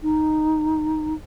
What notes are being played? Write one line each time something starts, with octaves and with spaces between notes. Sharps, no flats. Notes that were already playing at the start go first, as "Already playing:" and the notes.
D#4